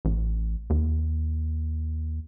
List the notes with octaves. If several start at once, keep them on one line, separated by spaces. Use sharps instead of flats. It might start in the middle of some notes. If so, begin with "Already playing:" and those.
A1
D#2